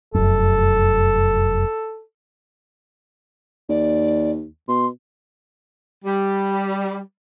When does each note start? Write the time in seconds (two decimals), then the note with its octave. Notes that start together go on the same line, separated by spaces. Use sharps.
0.14 F1 F#2 A4
3.69 D#2 D5
4.68 B2 C6
6.05 G3